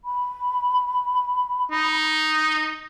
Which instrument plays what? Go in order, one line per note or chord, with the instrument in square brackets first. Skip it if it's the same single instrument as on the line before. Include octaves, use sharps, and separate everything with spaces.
[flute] B5
[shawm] D#4